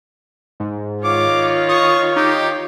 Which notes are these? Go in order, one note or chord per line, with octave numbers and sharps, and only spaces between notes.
G#2
D#3 F4 C#5 F5 D6
C#6 D#6
D#4 G4